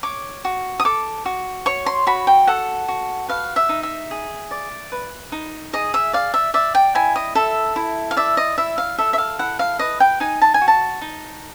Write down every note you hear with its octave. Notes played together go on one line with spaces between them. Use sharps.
C#5 D6
F#4
D#6
A4 D6
F#4
C#5 C#6
C6
F#4 B5
G5
A4 F#5
F#4
B4 F5
E5
D#4
E5
G#4
D5
B4
D#4
G#4 D#5
E5
D5 F5
E5
D5 E5
G5
E4 G#5
D#5
A4 E5
E4
F5
D5 E5
D#5
E4 E5
F5
A4 E5
E5
F5
E4 F#5
F5
B4 D#5
G5
D#4 G#5
A5
G#5
F#4
A5
D#4